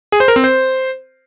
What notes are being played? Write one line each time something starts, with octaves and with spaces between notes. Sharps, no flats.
G#4
C5
A#4
C4
C5